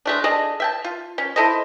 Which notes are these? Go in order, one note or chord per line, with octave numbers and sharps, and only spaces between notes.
G#3 A3 D4
D4 G#4 A4 D#5
E5 G5 A5
F4
C#4
E4 A4 C5 D#5